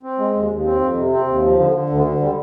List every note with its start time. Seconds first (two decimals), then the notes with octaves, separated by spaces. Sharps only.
0.03 C4
0.19 G#3
0.34 D#2
0.50 D#2
0.66 C4
0.81 F2
0.97 C3
1.12 C4
1.28 D#2
1.43 F3
1.58 D3
1.74 D3
1.89 D2
2.04 D3
2.20 G3